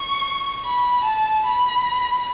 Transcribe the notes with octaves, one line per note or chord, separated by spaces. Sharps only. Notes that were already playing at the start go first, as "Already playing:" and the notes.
Already playing: C#6
B5
A5
B5